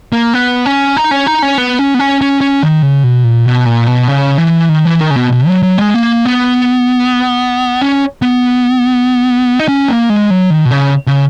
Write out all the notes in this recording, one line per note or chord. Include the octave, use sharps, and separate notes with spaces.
A#3
B3
C#4
D#4
C#4
D#4
C#4
B3
C#4
B3
C#4
C#4
C#4
D#3
C#3
B2
A#2
B2
A#2
B2
C#3
E3
D#3
E3
D#3
C#3
B2
B2
F#3
F#3
G#3
A#3
B3
C#4
B3
D#4
C#4
A#3
G#3
F#3
D#3
B2
C#3
C#3